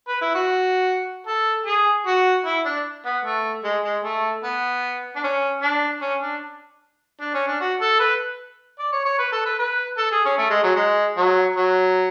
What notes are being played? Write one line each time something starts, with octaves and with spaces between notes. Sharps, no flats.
B4
E4
F#4
A4
G#4
F#4
E4
D4
B3
A3
G#3
G#3
A3
B3
D4
C#4
D4
C#4
D4
D4
C#4
D4
F#4
A4
B4
D5
C#5
C#5
B4
A4
B4
B4
A4
G#4
C#4
A3
G#3
F#3
G#3
F#3
F#3